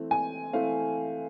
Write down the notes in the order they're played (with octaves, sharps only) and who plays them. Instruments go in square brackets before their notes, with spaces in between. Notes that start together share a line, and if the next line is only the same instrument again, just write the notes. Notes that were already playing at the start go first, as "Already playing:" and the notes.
Already playing: [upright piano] E3 A3 C4
G#5
E3 A3 C4 F5